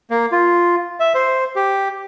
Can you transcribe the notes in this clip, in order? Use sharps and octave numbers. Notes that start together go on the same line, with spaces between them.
A#3
F4
E5
C5
G4